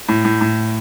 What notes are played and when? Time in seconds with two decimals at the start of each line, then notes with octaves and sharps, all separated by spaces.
0.09 A2
0.25 A2
0.41 A2